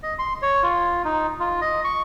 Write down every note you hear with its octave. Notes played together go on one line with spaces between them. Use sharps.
D#5
C6
C#5
F4
D#4
F4
D#5
C#6